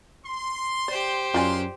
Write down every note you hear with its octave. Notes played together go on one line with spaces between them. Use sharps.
C6
G4 C5 D5
F#2 D#4 F4 D5 F5 G#5 C6